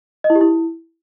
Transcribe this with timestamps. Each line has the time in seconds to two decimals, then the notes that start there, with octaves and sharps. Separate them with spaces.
0.24 D#5
0.30 E4
0.35 G4
0.41 E4